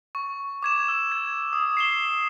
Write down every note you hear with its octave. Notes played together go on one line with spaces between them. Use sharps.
C#6
D6 G#6 E7
E6
G#6
D#6
C7 E7 G7